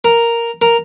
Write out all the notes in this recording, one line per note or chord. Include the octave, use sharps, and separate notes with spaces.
A#4
A#4